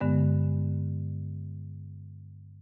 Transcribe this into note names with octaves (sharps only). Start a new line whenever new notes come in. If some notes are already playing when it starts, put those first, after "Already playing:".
G2 D3 G#3 B3